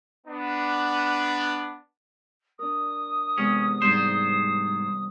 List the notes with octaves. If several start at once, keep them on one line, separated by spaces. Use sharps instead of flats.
B3 D4
D4 A#4 D#6
E2 C3 G#3 C#4
G#2 G3 C4 C5